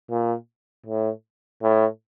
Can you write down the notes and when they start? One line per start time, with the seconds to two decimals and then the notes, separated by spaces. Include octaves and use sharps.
0.10 A#2
0.86 A2
1.62 A2